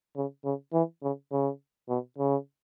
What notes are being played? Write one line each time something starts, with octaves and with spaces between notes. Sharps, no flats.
C#3
C#3
E3
C#3
C#3
B2
C#3